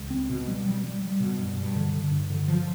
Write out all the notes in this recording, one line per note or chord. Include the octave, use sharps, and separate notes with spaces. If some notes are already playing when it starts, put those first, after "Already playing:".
Already playing: C#2
C4
B2
G3
G3
G3
G3
B2
G2
G2
D3
D3
G2
D3
F3